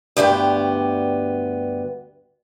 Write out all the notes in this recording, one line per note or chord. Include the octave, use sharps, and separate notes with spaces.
D2 G2 B3 G4